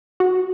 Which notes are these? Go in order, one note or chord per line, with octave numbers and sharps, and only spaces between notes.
F#4